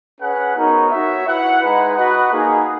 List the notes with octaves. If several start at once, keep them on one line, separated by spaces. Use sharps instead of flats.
C#4 G#4 B4 F#5
B3 D#4 F#4 A#4 C#5
F#4 C#5 E5
E4 B4 F#5
G#3 D#4 G#4 B4
F#4 B4 D#5 F#5
A#3 D#4 G#4